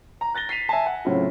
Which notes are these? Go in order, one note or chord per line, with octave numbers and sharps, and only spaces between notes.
A#5
F#6 A6 A#6 G7
B6 C7 D#7 F7
E5 G#5 A5
F#5
A2 C#3 F#3 C4 E4 F4